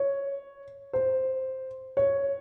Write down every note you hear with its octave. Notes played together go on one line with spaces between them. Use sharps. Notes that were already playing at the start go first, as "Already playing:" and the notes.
Already playing: C#5
C5
C#5